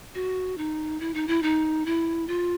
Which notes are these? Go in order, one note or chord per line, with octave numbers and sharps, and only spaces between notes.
F#4
D#4
E4
D#4
E4
D#4
E4
F4